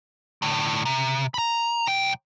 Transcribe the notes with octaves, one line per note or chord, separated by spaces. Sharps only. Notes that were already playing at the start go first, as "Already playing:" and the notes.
A2 D3
C3
A#5 B5
B1 G5